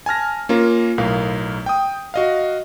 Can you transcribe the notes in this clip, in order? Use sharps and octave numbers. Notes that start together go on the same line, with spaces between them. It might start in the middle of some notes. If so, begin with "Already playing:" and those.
G#5 A5 F6 A#6
A#3 C#4 F4 A#4
B1 A2 A#4 F5
G5 D#6
F#4 D#5 F5